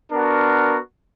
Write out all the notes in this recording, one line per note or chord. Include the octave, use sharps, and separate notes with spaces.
B3 D4 F#4 A#4